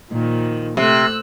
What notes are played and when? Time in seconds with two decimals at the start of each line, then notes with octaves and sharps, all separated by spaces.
0.10 A#2 D#3 F3
0.77 C3 A3 E6 F#6